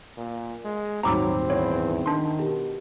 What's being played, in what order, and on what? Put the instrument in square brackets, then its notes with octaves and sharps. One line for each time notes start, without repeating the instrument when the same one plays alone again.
[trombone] A#2
G#3
[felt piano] D#1 G#2 B5 [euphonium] F#3 [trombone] C4 [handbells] A#5 D6 E6
[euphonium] E2 [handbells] C#5
[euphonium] D#3 [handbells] D4 C6
[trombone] B2 [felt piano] G4